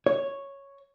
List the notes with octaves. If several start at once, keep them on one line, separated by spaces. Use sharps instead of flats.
C#5